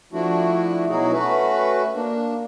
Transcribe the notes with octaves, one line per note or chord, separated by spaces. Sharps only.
F3 A3 D4 E4 F#4
B2 F#3 D#4 E4 F#4 G#4
A3 C#4 F#4 B4
A#3 D4